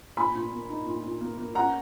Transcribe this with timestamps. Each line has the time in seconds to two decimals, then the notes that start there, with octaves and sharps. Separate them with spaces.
0.17 A#2 G#5 B5
0.35 A#2
0.52 A#3
0.69 D#4
0.86 A#2
1.04 A#2
1.21 A#3
1.38 A#3
1.55 C#4 F#5 A#5